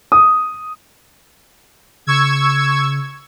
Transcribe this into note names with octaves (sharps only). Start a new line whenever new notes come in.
D#6
C#3 C#6 E6 G#6